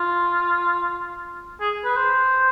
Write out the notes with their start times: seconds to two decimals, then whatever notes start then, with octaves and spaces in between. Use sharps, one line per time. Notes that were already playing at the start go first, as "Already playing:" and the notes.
Already playing: F4
1.60 G#4
1.84 B4
1.96 C5